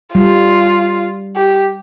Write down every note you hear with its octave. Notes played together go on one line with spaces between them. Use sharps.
G3 F4
G4